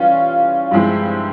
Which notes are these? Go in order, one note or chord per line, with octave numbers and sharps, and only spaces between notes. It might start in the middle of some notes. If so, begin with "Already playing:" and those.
Already playing: E3 G3 C#4 F4
G2 F3 G#3 C4 E4